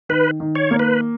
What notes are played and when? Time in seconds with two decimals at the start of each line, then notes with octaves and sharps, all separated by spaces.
0.09 D#3 B4
0.40 D#3
0.55 C#5
0.71 A#3
0.79 B4